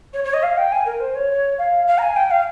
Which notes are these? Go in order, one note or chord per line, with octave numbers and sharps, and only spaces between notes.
C#5
C#5
D#5
F5
G5
G#5
A#4
C5
C#5
F5
F5
A#5
G#5
G5
F5